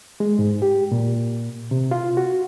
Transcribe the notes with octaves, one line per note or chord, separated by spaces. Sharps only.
G#3
G#2
G4
A#2
C3
F4
F#4